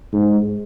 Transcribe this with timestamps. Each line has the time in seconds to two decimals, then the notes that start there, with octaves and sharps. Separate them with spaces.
0.13 G#2